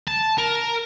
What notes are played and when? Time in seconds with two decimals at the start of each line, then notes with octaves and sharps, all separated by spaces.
0.07 A5
0.38 A#4